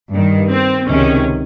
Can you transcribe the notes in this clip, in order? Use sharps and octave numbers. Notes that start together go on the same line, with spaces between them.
G2 D#3
C4
C#2 C3 D#3 C#4